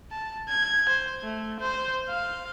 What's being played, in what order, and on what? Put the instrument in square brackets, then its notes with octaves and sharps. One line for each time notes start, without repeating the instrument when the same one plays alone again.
[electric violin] A5
G#6
C5
A3
C5
F5